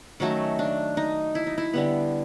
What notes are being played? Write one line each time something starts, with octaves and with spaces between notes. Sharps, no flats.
D#3 F#3 A3 C#4
D4
D#4
E4
D#4
E4
D3 G3 B3